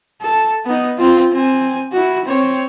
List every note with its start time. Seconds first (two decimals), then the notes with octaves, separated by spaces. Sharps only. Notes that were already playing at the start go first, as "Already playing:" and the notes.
0.22 A4
0.65 B3 D#4
0.98 C4 F4
1.32 C4 G#5
1.92 E4 F#4
2.25 C4 C#5